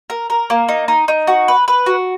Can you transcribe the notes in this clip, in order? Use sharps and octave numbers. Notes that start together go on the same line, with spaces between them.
A#4
A#4
A#3
D#4
D#4
D#4
F#4
B4
B4
F#4